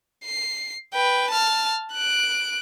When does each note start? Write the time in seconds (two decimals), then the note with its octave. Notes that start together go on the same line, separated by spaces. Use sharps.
0.24 C7
0.94 B4 G5
1.30 A5 F6
1.94 F#6 D7